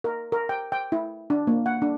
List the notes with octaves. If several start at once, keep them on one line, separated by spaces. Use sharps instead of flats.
A#4
A#4
G5
G5
E4
D4
A#3
F#5
D4